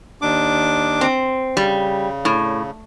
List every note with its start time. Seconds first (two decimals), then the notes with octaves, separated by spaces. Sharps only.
0.22 D#2 D4 D6
1.01 C4
1.57 C#3 G3
2.25 A2